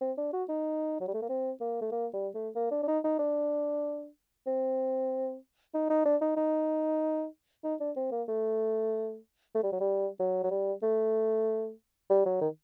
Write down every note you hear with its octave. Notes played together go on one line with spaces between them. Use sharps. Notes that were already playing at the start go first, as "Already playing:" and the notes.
C4
D4
F#4
D#4
F#3
G3
A3
A#3
C4
A#3
A3
A#3
G3
A3
A#3
D4
D4
D#4
D#4
D4
C4
D#4
D#4
D4
D#4
D#4
D#4
D4
C4
A#3
A3
A3
G3
F#3
G3
F#3
F#3
G3
A3
G3
F#3
D#3